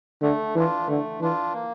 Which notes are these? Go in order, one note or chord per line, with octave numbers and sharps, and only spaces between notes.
D3 A3
E3 D4 F4
D3 A3
E3 D4 F4
A#3